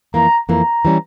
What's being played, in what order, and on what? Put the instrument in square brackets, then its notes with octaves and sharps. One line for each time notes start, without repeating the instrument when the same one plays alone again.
[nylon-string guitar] F2 E3 A#3 [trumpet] A#5
[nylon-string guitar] F2 E3 A#3 [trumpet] A#5
[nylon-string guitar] E3 G3 C#4